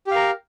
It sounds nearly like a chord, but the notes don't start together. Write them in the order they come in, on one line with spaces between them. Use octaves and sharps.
G4 F5 A#4